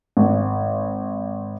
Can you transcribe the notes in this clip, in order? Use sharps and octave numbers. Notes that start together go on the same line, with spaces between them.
G#1